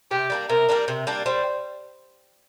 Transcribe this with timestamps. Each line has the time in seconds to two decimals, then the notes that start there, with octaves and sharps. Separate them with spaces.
0.11 C3 G4
0.30 G3 A#3 D4
0.49 C3 A#4
0.69 G3 A#3 D4
0.88 C3
1.07 G3 A#3 D4
1.26 G3 C5